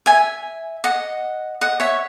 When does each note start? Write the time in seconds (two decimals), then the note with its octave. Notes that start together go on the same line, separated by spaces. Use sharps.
0.06 E5 G#5
0.84 D#5 F#5
1.61 D#5 F#5
1.80 C#5 E5